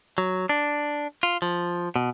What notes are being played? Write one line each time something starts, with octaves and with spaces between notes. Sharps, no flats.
F#3
D4
F4
F3
B2